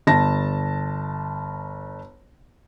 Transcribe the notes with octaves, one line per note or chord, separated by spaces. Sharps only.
G1 A5 A#6